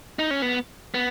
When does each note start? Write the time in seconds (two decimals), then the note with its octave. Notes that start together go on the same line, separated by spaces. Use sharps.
0.19 D#4
0.31 C#4
0.42 B3
0.94 B3